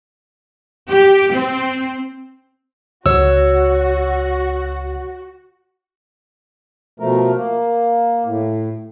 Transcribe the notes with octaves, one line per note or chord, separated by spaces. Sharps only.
G4
C4
C#2 F#4 C#5 E6
B2 F3 A3 A#4
A#3
A2